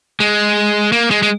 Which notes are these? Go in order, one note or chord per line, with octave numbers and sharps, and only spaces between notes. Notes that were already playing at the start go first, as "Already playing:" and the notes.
G#3
A#3
G#3
G#3